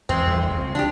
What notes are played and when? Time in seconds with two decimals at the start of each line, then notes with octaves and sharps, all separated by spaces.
0.09 E2 G#3 C4
0.27 E2 G3
0.50 C#2 C#3
0.75 D4 F#4 G4